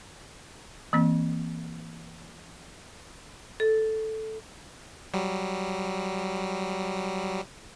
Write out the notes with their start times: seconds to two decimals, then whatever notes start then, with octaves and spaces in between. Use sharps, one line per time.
0.93 E3 A#3 C4
3.60 A4
5.14 F#3 G3